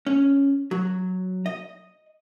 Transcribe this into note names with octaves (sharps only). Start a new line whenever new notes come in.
C#4
F#3
D#5